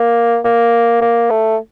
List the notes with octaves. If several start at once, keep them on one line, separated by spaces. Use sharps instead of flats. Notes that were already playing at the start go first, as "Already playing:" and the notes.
Already playing: A#3
A#3
A#3
A3